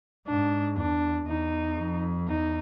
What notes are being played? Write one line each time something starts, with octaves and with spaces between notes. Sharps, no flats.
G#2 D4
E2 D4
E2 D#4
F2
E2 D#4